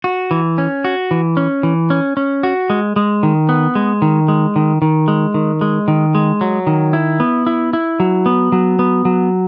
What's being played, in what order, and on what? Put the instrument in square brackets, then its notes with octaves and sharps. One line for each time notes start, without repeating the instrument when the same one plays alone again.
[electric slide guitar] F#4
E3
C#4
F#4
E3
C#4
E3
C#4
C#4
F#4
G#3
G#3
D#3
B3
G#3
D#3
G#3
D#3
D#3
G#3
D#3
G#3
D#3
G#3
F#3
D#3
E4
B3
E4
E4
F#3
B3
F#3
B3
F#3